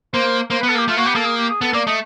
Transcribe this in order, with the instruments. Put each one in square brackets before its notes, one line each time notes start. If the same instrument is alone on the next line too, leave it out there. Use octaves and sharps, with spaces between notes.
[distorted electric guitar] A#3 [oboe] C5
[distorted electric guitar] A#3 [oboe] C5
[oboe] B4
[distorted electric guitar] B3
[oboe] A4
[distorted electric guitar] A#3
[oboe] G4
[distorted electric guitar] A3 [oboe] F4
[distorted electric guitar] A#3 [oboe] F#4
[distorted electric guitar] B3 [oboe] G4
[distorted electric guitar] A#3 [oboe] A4
[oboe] G#4
G4
G#4
[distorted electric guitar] B3 [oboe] A4
[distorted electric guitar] A#3 [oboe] D5
[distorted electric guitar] A3 [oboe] D#5